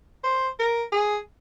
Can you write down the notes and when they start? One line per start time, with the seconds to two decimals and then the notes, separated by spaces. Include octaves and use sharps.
0.24 C5
0.59 A#4
0.92 G#4